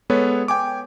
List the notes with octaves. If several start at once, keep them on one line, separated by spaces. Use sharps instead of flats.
G#3 B3 A4 B4 C#5
G5 G#5 D6